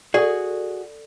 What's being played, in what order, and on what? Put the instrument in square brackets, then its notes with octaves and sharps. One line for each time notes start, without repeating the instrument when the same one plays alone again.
[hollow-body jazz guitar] F#4 G#4 [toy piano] A4 D5